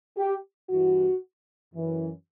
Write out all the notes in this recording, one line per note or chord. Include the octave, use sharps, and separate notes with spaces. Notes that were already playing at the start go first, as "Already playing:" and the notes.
G4
G2 E3 F#4
F#2 E3